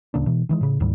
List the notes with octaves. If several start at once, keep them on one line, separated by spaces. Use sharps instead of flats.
D1 C#3 A#3 D4
B2 E3
D#3 E3 G#3
A2 C#3
D2 G#2 D#3 G3